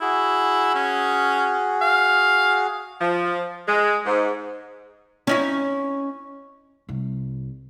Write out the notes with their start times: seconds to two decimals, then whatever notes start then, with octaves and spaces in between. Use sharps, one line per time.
0.01 E4 F#4 G#4
0.75 C#4
1.81 F5
3.01 F3
3.67 G#3
4.05 G#2
5.27 C#4 D#4 E4
6.89 C2 C3